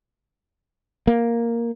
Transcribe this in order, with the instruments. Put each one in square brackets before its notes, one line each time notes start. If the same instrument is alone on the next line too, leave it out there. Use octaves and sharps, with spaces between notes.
[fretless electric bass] A#3